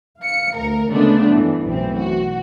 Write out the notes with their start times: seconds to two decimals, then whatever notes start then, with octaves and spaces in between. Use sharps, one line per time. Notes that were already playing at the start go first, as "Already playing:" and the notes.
0.18 F5 C#7
0.55 D2 A#4
0.91 C#3 G#3 A3 B3 D4
1.32 G2 E3
1.64 B1 F#2 A2 E3 C4
1.97 F#4